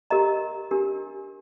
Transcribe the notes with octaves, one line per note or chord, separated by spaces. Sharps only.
G4 A#4 D#5 A#5
D4 G4 A#4